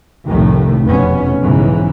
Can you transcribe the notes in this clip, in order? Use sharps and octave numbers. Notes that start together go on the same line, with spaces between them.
F1 C2 A2 C3 D#3 A3
F1 E2 B2 B3 C#4
B1 G#2 C#3 E3